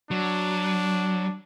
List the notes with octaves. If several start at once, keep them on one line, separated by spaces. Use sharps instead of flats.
F#3 D4